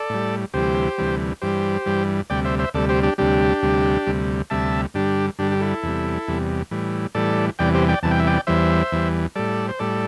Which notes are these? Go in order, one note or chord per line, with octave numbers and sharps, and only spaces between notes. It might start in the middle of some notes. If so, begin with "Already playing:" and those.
Already playing: A4 D5
A2 G3
D2 C3 E3 G3 G4 C5
D2 C3 E3 G3
G2 E3 G3 G4 C5
G2 E3 G3
D2 C3 G3 D5 G5
C5 E5
C5 E5
D2 C3 G3 A4 D5
G4 C5
D4 G4
D2 C3 G3 D4 G4
D2 C3 G3
D2 C3 G3
D2 C3 G3 E5 A5
G2 D3 G3 D4 G4
G2 D3 G3 D4 G4
G4
E4 A4
E2 C3 G3
E2 C3 G3
A2 E3 G3
A2 E3 G3 A4 D5
E2 C3 E3 G3 D5 G5
G4 C5
D5 G5
E2 C3 E3 G3 A5
G5
E5
D5 G5
E2 E3 G3 C5 E5
E2 E3 G3
A2 G3 A4 D5
C5
A2 G3 A4 D5